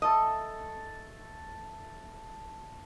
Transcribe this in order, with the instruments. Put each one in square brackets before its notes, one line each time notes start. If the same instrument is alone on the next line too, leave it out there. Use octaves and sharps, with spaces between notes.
[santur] A3 A4 [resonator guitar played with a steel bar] D#5